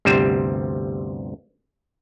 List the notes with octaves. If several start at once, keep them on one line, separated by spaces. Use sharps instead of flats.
G1 D2 C3 G3 C5